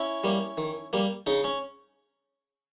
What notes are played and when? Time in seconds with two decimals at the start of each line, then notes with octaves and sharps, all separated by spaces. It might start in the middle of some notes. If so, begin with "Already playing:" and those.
Already playing: C#4 E4
0.24 G3 A#3
0.58 D#3
0.93 G3 A#3
1.26 C#3 D#4
1.44 C#4